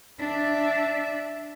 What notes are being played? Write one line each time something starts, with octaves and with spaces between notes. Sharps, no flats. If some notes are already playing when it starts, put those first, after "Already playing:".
D4 E5